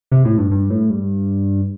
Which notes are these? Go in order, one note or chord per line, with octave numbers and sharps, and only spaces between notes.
C3
A2
G2
G2
A2
G2